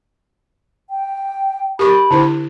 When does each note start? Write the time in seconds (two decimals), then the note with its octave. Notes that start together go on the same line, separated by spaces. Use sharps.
0.90 G5
1.79 G4 A#4 B5 C#6
2.11 D3 E4 C5